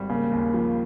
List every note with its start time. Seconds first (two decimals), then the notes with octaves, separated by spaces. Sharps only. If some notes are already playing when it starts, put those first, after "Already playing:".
Already playing: G#1 G3
0.09 C#3 A#3
0.32 D#2
0.54 F3